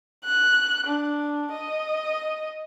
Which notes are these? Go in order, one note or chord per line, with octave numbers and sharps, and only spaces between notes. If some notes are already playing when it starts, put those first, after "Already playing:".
F#6
D4
D#5